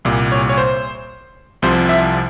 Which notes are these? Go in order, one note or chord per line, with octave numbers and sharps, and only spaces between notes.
C2 A#2 G3 A#3
C#5
C#5
C5
C2 C3 F3 C5
E5